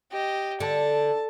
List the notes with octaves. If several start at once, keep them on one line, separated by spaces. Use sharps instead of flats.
G4 D#5
D3 A5